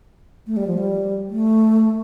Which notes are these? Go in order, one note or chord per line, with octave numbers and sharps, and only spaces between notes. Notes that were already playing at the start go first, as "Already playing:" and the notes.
A3
G3
F3
G3
A3